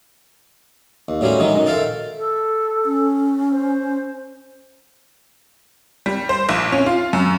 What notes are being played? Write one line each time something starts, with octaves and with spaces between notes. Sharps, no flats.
D#2
A2 F#3 G3 C#4 C5 B5
D#3 E3 F#3 G#3 D#4
F#2 D#3
A4 C5 E5 F5 G5 A5
A4
C#4
C5
G3
C5
A#1
C#4
F4
F#2